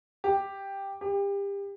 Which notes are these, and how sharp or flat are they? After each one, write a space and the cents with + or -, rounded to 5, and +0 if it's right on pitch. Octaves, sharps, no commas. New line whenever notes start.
G4 +5
G4 +30